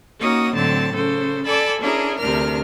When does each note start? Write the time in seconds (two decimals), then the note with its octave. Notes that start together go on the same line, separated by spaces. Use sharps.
0.19 A#3 C#4 D#4 F#4 D#6
0.54 A2 D3 F#3 C4 A5
0.94 C#3 A4 C5
1.46 A4 D5 G#5 A5 B5
1.81 C#4 D4 E4 G#4 A#4
2.18 D2 C3 D4 A#4 F6